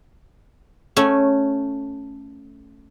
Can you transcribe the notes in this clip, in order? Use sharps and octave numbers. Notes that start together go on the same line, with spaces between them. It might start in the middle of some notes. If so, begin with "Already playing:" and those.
A3 C#4